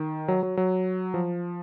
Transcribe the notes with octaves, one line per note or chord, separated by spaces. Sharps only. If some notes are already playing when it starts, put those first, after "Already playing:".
Already playing: D#3
F#3
F#3
F#3
F3